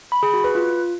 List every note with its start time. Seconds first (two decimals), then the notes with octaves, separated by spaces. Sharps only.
0.12 B5
0.23 G#4
0.33 F#4
0.44 B4
0.55 F4